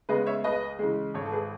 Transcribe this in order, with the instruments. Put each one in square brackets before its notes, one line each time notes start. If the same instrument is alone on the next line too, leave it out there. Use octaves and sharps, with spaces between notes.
[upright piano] C#3 G#3 B3 B4 D#5
C#5 E5
C#2 B4 D#5
C#3 E3 G#3
G#1 A4 C#5
A4
G#4 B4